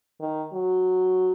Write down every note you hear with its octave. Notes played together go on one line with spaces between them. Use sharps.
D#3
F#3